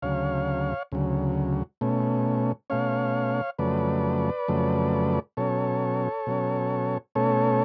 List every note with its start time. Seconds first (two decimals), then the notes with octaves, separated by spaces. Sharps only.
0.02 D2 C#3 F#3 C#5 F5
0.92 D2 C#3 F#3
1.81 B2 A3 C#4
2.70 B2 A3 C#4 C#5 F5
3.59 F2 C#3 F#3 A3 B4 D5
4.48 F2 C#3 F#3 A3
5.37 B2 F#3 C#4 A4 C#5
6.27 B2 F#3 C#4
7.15 B2 A3 C#4 A4 C#5